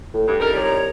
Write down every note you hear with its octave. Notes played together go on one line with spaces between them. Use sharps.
A2
G2 D3
C2 C#3 D#4 A4 A#4 A#5
D#3 F3 G3 C#5 A#5